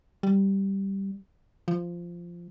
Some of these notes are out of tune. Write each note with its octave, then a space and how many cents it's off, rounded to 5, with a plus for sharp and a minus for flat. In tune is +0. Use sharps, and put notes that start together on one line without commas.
G3 -5
F3 -10